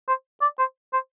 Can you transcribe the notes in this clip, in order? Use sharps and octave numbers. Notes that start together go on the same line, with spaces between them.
C5
D5
C5
C5